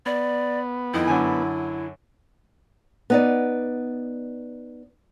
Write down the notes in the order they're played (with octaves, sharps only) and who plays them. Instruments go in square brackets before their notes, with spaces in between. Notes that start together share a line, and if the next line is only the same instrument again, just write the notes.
[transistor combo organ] B3 [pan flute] D5
[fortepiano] F2 D#3 D#5 [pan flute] E4
[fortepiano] F#2 D3 G#5
[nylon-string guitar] B3 D#4 D5